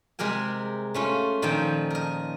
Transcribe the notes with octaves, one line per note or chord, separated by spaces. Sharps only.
C3 G#3 G4 A#4 G#5
A3 C#4 F4
A#2 D#3 F3 A4 G5 A5
A#4 D#5